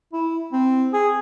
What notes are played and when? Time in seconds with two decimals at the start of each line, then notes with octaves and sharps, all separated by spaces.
0.13 E4
0.53 C4
0.93 G#4